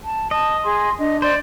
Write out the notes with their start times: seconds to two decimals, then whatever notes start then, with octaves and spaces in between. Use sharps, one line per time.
0.04 A5
0.31 D#5 A5
0.64 G#4 C6
0.99 D4 D#5
1.22 C5 D5